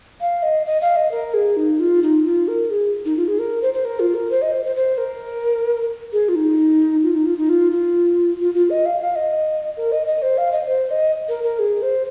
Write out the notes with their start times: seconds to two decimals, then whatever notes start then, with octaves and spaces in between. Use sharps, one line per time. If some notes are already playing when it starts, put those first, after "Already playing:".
0.21 F5
0.43 D#5
0.66 D#5
0.82 F5
0.96 D#5
1.12 A#4
1.34 G#4
1.57 D#4
1.80 F4
2.03 D#4
2.25 F4
2.48 A#4
2.70 G#4
3.05 D#4
3.17 F4
3.28 G#4
3.39 A#4
3.62 C5
3.74 C5
3.85 A#4
4.00 F4
4.14 A#4
4.31 C5
4.42 D#5
4.52 C5
4.65 C5
4.76 C5
4.98 A#4
6.13 G#4
6.29 F4
6.35 D#4
7.03 F4
7.15 D#4
7.26 F4
7.37 D#4
7.49 F4
7.72 F4
8.40 F4
8.55 F4
8.70 D#5
8.86 F5
9.00 F5
9.16 D#5
9.77 A#4
9.92 D#5
10.07 D#5
10.22 C5
10.38 F5
10.52 D#5
10.68 C5
10.91 D#5
11.29 A#4
11.43 A#4
11.59 G#4
11.82 C5